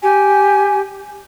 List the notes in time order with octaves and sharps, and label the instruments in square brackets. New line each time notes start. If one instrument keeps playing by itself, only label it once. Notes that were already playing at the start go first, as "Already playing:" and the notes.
[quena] G4 [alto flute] G#5